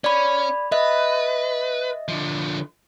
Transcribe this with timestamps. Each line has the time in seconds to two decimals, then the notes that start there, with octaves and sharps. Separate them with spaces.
0.04 C#4 D5 B5
0.72 B4 D#5 E5
2.08 D3 F3